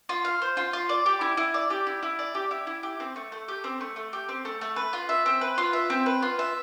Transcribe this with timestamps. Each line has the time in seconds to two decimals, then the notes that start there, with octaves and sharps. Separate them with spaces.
0.09 F4
0.25 F5
0.42 C5
0.57 F4
0.73 F4
0.89 D5
1.06 G4
1.21 E4
1.37 E4
1.54 D5
1.70 G4
1.87 E4
2.03 E4
2.19 D5
2.35 G4
2.51 E4
2.67 E4
2.83 G4
3.00 C4
3.16 A3
3.32 A3
3.48 G4
3.64 C4
3.81 A3
3.96 A3
4.13 G4
4.29 C4
4.45 A3
4.61 A3
4.76 B4
4.93 F4
5.09 E5
5.26 C4
5.41 B4
5.58 F4
5.73 E5
5.90 C4
6.06 B4
6.22 F4
6.39 E5